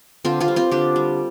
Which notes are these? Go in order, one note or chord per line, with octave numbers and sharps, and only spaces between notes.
D3 C4 F4
C4 F4
G3
C4 F4
D3 D4 G4
G3